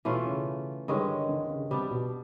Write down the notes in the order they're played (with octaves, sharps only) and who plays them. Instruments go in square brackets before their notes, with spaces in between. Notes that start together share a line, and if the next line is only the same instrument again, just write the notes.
[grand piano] B2 [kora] E3 A3 C#4 F4
[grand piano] C#3
[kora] G2 D#3 G#3 C#4 [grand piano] D3
[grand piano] D3
C#3
[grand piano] C3 [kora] G3 B3 D4
[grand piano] B2